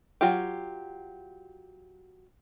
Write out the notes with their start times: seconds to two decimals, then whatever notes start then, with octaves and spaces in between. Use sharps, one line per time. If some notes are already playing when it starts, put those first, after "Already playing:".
0.21 F#3 F4 G4